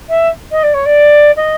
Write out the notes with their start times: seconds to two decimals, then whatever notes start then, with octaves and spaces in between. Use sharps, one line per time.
0.09 E5
0.51 D#5
0.63 D5
0.74 C#5
0.86 D5
1.36 D#5